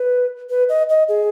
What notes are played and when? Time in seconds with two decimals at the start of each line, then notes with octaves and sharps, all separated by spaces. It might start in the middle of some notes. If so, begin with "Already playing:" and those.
Already playing: B4
0.50 B4
0.69 D#5
0.90 D#5
1.09 G#4